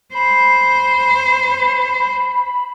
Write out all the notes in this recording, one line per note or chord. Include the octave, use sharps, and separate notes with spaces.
C5 B5